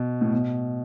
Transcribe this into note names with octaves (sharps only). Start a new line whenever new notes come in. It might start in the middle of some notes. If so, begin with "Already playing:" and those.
Already playing: B2
A2
B2